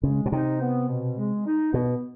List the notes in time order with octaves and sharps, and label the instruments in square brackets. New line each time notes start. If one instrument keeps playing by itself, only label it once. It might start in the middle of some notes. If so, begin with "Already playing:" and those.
[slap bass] C#3 [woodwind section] G#3
[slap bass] B2
[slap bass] C3 [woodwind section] D#4
[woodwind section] B3
B2
G#3
D#4
[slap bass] B2 [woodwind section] B3